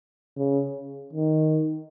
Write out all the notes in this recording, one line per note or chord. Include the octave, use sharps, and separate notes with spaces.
C#3
D#3